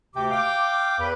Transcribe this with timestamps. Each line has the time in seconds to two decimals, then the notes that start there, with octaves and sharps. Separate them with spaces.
0.15 D2 C3 G5 D6
0.31 F5 G5 D6
0.99 E2 B4